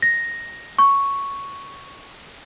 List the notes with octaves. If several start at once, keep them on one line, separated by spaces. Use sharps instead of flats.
A#6
C#6